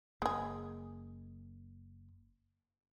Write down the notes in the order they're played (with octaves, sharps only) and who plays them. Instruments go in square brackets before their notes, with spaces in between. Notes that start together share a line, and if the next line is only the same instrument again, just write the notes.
[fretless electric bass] F#1 A#3 [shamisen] G#3 G#4